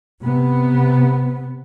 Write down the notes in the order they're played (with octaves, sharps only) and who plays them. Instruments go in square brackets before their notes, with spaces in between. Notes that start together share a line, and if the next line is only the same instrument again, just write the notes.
[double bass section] C3 B3